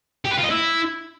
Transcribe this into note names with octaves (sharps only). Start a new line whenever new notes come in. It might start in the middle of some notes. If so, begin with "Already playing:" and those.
G4
B4
F4
D#5
E4